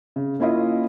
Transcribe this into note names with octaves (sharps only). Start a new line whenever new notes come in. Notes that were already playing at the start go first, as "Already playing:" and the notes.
C#3
A#3 C#4 E4 F4 D#5